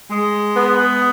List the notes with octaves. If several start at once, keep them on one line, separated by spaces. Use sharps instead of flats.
G#3
B3